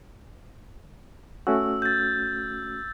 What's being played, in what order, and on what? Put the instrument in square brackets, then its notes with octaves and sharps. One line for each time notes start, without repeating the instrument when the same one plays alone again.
[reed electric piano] A3 C#4 F#4 [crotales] E6
[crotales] G6 A6